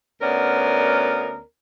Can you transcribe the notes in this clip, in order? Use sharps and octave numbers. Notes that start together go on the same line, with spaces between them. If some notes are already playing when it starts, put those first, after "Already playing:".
D2 B3 C#4 A#4 D5